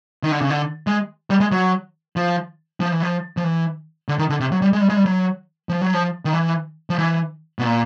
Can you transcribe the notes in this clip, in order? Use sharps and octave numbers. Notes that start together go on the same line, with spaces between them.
D#3
D3
C#3
D3
G#3
G3
G#3
F#3
F3
F3
E3
F3
F3
E3
D3
D#3
D3
C3
F#3
G3
G#3
G3
G#3
G3
F#3
F3
F#3
F3
D#3
E3
F3
E3
B2
A#2